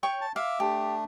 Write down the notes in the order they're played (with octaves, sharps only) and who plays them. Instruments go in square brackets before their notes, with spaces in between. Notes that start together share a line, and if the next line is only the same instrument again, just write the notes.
[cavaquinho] C#5 G5 C#6
[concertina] A5
[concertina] E5 D6 [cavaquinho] F5
[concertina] A3 D4 [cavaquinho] G4